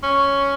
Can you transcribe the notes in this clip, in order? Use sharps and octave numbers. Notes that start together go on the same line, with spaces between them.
C#4